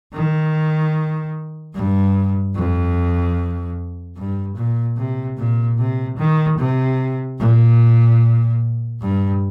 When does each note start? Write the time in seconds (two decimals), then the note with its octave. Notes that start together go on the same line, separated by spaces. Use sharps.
0.14 D#3
1.74 G2
2.55 F2
4.17 G2
4.56 A#2
4.97 C3
5.37 A#2
5.78 C3
6.18 D#3
6.58 C3
7.39 A#2
9.01 G2